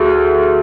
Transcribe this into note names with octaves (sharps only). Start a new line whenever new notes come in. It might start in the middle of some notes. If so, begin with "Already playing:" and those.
Already playing: D2 F#4 G#4
A4